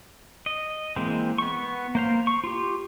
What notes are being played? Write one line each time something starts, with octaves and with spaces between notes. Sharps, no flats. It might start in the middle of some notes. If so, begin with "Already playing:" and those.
D#5
E3 G#3 A#3 C4
B3 C#6
A#3 C5 F5
C#6
F4 G4